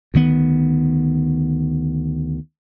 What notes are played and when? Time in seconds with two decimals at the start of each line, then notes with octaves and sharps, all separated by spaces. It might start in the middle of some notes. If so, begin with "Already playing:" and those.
0.14 D2 D#3 B3